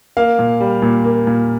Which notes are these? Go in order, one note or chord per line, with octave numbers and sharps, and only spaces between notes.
A#3 F5
A#2
G3
A#2
A#3
A#2